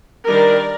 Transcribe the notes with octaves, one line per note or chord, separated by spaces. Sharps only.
D#3 G3 D4 A#4 D5